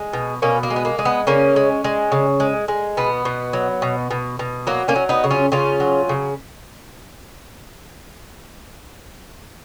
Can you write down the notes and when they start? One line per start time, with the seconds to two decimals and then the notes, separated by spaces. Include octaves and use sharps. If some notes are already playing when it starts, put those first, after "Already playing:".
Already playing: G#3
0.13 B2
0.42 B2 A#3 C#4
0.63 A#3
0.70 G#3
0.76 B3
0.85 A#3
0.99 G#3
1.05 B3
1.27 C#3 A#3 C#4
1.56 G#3
1.84 G#3
2.12 C#3
2.40 G#3
2.68 G#3
2.97 B2 B3
3.25 B2
3.53 F#3
3.82 B2
4.11 B2
4.39 B2
4.67 F#3 A#3
4.88 A#3 C#4
4.96 F#3
5.09 B3 D#4
5.24 C#3
5.31 C#4 F4
5.52 C#3 C#4 F4
5.80 F#3
6.09 C#3